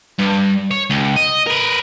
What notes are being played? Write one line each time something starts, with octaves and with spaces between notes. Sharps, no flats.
G2
C#5
C#2
D#5
A#4 B4